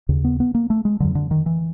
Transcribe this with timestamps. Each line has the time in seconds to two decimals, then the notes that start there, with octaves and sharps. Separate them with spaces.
0.09 D#2 C#3
0.24 B3
0.40 B3
0.55 A#3
0.70 A3
0.85 G#3
1.00 F2 D3 F#3
1.15 D3
1.31 D#3
1.46 E3